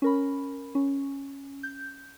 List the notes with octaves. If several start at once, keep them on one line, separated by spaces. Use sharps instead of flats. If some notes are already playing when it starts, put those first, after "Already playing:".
C#4 A#4 B5
C#4
G6